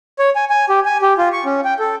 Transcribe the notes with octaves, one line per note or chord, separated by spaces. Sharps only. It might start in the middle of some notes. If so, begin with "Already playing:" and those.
C#5
G#5
G#5
G4
G#5
G4
F4
C#6
C#4
G5
A4